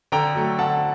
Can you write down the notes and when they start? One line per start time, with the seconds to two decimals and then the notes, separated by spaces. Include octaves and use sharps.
0.12 D3 G5 A#5
0.35 F#3 A3
0.59 D3 F#5 A5